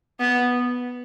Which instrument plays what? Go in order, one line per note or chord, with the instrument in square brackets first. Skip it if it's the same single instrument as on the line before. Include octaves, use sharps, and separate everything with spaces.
[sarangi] B3